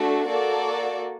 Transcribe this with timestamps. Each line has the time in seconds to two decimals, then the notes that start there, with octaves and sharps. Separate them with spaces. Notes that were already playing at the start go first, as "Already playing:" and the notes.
Already playing: A3 D4 F#4 A4
0.26 A#3 F#4 A4 D5